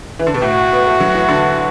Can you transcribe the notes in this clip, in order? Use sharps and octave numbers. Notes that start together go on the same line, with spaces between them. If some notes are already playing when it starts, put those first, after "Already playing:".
E3
D3
B2
A2 F#4
B3
A3
F#3
E3
D3